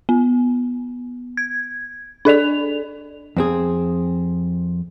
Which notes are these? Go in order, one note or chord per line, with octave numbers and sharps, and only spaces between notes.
B3
G#6
D4 A4 D5 F7
F2 C4 G#4